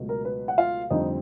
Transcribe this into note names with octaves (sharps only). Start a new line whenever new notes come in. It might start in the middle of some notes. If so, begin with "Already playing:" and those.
Already playing: C#2 B2 F#3 A3
A#4
B4
F#5
F4 F5
F1 F2 D3 G3 C4 D#4 D#5